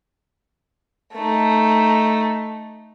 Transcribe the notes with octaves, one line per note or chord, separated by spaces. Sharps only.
A3 D#4